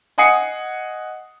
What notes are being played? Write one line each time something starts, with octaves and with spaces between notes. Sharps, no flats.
D#5 F#5 G#5 D#6 C7 C#7